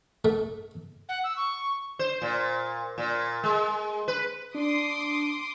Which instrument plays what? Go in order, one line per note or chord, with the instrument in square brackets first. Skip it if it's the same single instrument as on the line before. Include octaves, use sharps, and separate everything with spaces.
[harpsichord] A3
[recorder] F#5
E6
C#6
[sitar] C5
A#2
A#2
G#3
B4
[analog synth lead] D4 [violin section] C6 D6 D#6